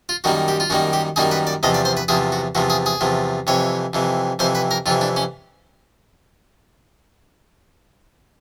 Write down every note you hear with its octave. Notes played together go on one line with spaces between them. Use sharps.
F4
F#2 D#3 G3 A#3 F#4
G4
F4
F#2 D#3 G3 A#3 F#4
G4
F#2 D#3 G3 A#3 G#4
B4
D5
E2 C3 F3 D#5
D5
C5
B4
E2 C3 F3 G#4
F#4
E2 C3 F3 F#4
G#4
G#4
E2 C3 F3
F2 C3 E3 C#5
F2 C3 E3
F2 C3 E3 C5
B4
A#4
F2 C3 E3 F4
D4
C#4